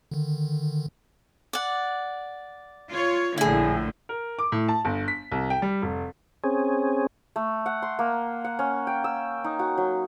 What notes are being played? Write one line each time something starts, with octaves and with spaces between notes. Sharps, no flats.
D3 D#3
D5 F#5
F4 C#5
A#1 A2 D3 E4 G#4
A#4
D6
A2
A5
G1
B6
C2
G5
G3
F1
C4 C#4 G#4
A3
F#5
C6
A#3
F#5
C#4
G5
E6
D#4
F#4
F#3